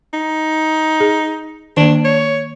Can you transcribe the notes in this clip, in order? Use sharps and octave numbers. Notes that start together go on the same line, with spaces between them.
D#4
G#4
D#3 A#3 D4
C#5